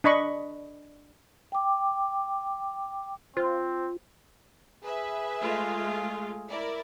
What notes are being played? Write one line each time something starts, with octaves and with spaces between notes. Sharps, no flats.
D4 D#5 B5 C#6
G5 D6
C4 F4 C5
G#4 B4 E5
G#3 A3 F4
E4 A#4 D5